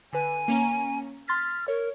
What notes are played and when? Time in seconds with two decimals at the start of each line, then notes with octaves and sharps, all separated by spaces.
0.13 D3 B4 G#5
0.48 A#3 C#4 A#5
1.28 C6 F6 A6 B6
1.68 A#4 C#5